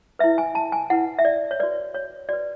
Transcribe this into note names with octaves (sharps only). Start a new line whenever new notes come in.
E4 B4 E5
G#5
A5
G#5
E4 B4 F#5
E5
D5
C#5
F#4 B4 D5
C#5
F#4 B4 D5